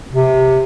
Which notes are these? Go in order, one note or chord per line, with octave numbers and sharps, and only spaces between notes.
C3